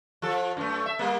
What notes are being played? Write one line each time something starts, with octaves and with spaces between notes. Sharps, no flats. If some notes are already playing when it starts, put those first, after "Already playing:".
F3 A4
F#2 A3
E5
G3 A#3